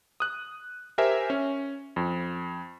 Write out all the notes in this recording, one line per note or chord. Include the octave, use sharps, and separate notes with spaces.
D#6 F#6
G4 A#4 C5 E5 G#5
C#4
F2